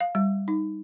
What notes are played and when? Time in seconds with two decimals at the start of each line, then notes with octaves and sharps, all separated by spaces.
0.01 F5
0.15 G3
0.48 D#4